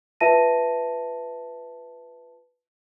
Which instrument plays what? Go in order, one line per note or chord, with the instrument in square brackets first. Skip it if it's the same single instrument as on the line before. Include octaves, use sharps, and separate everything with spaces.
[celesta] F4 B4 E5 A5 A#6 D#7